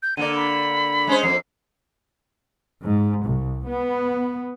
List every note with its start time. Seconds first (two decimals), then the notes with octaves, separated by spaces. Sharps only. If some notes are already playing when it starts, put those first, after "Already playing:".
0.03 G6
0.17 D3 A#3 D5 D#7
0.35 B5
1.07 G#3 C#4 C5
1.23 F2 A#3 C7
2.82 G#2
3.25 C2
3.66 B3